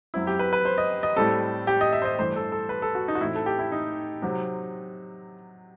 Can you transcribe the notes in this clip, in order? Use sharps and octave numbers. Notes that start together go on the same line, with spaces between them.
F#2 F#3 C4 E4
G4
B4
B4
C5
D#5
D#5
A2 G3 C4 A4
G4
D#5
E5
C5
D#5
G2 E3 A3 C5
A4
A4
B4
A4
F#4
D#4
F#4
A2 E3 A3 C4 E4
A4
G4
E4
D#4
C3 F#3 C4